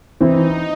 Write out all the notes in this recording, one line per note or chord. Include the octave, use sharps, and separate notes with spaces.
E3 C4 D#4 E4